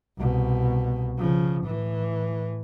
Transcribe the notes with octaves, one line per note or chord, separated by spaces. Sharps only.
C2 B2
C#3 F3
A2 E3